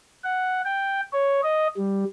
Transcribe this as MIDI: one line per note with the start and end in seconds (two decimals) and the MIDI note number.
0.24 0.62 78
0.65 1.01 79
1.13 1.41 73
1.43 1.68 75
1.77 2.04 55